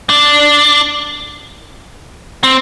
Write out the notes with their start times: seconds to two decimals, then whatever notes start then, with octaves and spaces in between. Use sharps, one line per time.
0.10 D4
2.44 C4